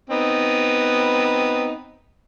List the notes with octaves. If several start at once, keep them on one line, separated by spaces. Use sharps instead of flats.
B3 C4 D#4